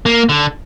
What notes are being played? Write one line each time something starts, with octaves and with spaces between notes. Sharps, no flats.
A#3
D3